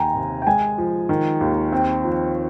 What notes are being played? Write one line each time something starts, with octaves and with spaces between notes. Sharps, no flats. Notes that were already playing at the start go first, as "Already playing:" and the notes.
Already playing: D#2 D#3 G5 G#5 A#5
C3
G5
G#3 G#5
F3
D#3
D#2
C4 G5
F3